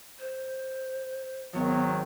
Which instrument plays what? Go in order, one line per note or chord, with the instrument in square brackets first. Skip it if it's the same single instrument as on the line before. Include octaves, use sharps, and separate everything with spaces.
[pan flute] C5
[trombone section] G#1 D#3 F#3 [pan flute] B3